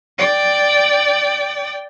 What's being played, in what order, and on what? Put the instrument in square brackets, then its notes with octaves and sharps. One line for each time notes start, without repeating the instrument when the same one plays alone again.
[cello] D5 G5